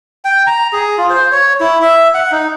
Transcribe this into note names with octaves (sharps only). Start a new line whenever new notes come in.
G5
A#5
G#4
F4
C5
C#5
E4
E5
F#5
D#4